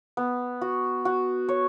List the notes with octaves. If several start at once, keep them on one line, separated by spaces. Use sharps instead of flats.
B3
F#4
F#4
C#5